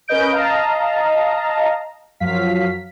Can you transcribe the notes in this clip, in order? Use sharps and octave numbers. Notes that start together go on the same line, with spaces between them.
C#4 A#4 B4 D#5 G6 D7
D#5 F5 A5 A#5
F#2 F3 F#3 F5 B6